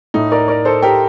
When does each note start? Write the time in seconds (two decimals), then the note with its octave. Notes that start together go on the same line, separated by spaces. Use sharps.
0.14 A2 A3 D#4
0.32 A#4 D5
0.48 A#4 D5
0.65 A4 C5
0.82 G4 A#4